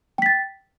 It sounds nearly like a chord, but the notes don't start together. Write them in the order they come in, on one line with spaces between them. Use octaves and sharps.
G5 B6 A6